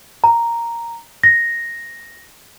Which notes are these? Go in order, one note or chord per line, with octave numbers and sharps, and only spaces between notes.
A#5
A#6